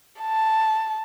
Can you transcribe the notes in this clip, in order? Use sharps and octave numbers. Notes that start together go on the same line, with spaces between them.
A5